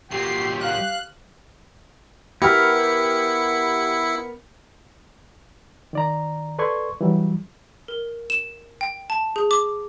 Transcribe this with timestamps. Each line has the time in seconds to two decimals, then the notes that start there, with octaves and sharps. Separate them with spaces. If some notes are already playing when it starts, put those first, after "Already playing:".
0.11 A#2 F#3 G4 C7
0.61 F5 F#6
2.42 B3 E4 G4 A#4 F6 C#7
5.93 D#3 D5 A#5
6.59 A4 B4 D5 C6 C#6 G#6
7.01 E3 F#3 G3
7.88 A#4
8.30 E7
8.81 G5
9.10 A5
9.36 G#4
9.51 D6